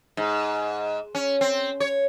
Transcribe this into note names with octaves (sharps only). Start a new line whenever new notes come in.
G#2
C#4
C4
C#5